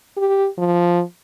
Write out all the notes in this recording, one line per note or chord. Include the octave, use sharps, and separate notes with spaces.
G4
F3